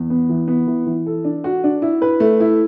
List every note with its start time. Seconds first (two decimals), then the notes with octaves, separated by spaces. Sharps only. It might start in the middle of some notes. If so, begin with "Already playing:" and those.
Already playing: E2
0.10 B3
0.29 E3
0.48 B3
0.67 E3
0.86 E3
1.06 A4
1.24 D4
1.44 F#4
1.64 D4
1.82 E4
2.02 B4
2.20 A3
2.40 E4